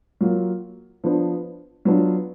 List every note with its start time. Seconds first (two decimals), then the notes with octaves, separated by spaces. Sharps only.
0.21 F#3 A#3 F4
1.04 F3 B3 D4
1.85 F#3 B3 D4 F4